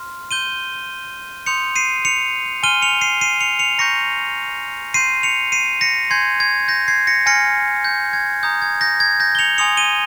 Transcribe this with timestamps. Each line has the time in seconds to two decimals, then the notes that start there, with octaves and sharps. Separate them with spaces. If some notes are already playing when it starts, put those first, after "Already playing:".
Already playing: C6 F6
0.31 C6 G6 D#7 G7
1.46 C6 D#6 G6 C#7 F7
1.76 C7 D#7
2.05 C#7 F7
2.63 G#5 C6 F6 D#7 G7
2.82 C#7 F7
3.01 C7 D#7
3.21 C7 D#7
3.40 C#7 F7
3.59 C#7 F7
3.78 A#5 C#6 G6 A#6 C#7
4.94 C6 G6 C7 D#7
5.23 C#7 F7
5.52 C7 D#7
5.81 A#6 C#7
6.10 G#5 C6 G6 G#6 C7
6.40 G#6
6.68 G6 A#6
6.88 G#6 C7
7.07 A#6 C#7
7.26 G#5 C6 F6 A#6 C#7
7.84 G6
8.13 G#6
8.43 A#5 D#6 G6
8.62 G#6
8.81 G6 A#6
9.00 G#6
9.20 G6 A#6
9.35 G7
9.39 C#7 F7
9.58 G#5 C6 D#6 G6 C#7 F7
9.77 D#7 G7